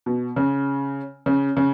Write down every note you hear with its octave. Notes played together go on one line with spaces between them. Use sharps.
B2
C#3
C#3
C#3